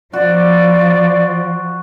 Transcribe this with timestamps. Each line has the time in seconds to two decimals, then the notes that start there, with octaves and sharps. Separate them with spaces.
0.13 F3 F#4 D5